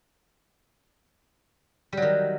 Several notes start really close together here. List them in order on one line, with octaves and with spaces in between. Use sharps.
G3 F#3 D#3